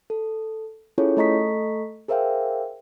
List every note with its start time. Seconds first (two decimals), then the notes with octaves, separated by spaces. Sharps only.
0.10 A4
0.98 C#4 E4 F4 G#4 A4 C#5
1.17 A3 A4 D#5 A#5 C#6 B6
2.08 G#4 A#4 C5 E5 F5 G5